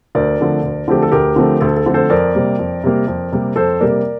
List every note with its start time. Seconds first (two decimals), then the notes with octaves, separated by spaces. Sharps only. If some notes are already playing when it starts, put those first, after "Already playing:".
0.15 D2 A#4 D5
0.39 D3 F3 A3 C4
0.63 D2
0.88 D3 F3 A3 C4 G4
1.03 A4
1.12 D2 G4 A#4
1.36 D3 F3 A3 C4
1.60 D2 A4
1.77 A4
1.86 D3 F3 A3 C4
1.94 A4 C5
2.10 F2 A#4 D5
2.35 C3 G3 A#3
2.59 F2
2.84 C3 G3 A#3
3.08 F2
3.32 C3 G3 A#3
3.56 F2 A4 C5
3.80 C3 G3 A#3 A#4 D5